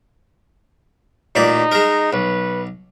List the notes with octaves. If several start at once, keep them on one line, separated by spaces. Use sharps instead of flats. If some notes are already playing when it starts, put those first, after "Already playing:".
A1 A#2 D#4 D5
G#3 A#4
B1 B4